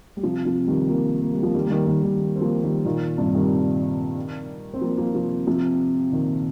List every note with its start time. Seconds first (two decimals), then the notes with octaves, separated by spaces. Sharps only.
0.17 G3
0.23 C3 F3
0.45 C3 F3
0.67 D#3 G3
0.89 F3 A#3
1.21 A#3
1.33 G3
1.43 F3 A#3
1.54 D#3 G3
1.65 A#3
1.70 D#3 G3
1.87 D#3 G3
2.03 D#3 G3
2.36 C4
2.41 F3 A#3
2.63 D#3 G3
2.85 A#2 D#3
3.18 G2 C3
3.34 D#3 G3
4.74 C4
4.81 F3 A#3
4.97 F3 A#3
5.14 C3 F3
5.47 C3 F3
6.12 A#2 D#3